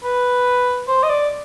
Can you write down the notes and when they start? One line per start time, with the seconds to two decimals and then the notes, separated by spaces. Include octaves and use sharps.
0.04 B4
0.88 C5
1.03 D#5
1.09 D5